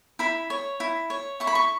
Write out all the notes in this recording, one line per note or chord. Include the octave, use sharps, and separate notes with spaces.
E4 B5
C#5
E4
C#5
E4 C#6
B5
C#6